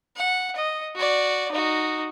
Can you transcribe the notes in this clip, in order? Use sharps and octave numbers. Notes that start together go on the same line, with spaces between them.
F#5
D#5
F#4 D5
D#4 F#4